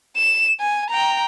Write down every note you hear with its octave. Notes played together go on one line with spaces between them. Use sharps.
E7
G#5
G5 A#5